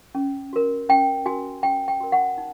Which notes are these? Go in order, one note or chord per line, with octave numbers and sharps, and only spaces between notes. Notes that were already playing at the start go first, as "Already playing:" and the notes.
C#4
F#4 A#4
C#4 G5
F#4 A#4 G#5
C#4 G5
G5
F#4 A#4
F#5
D#4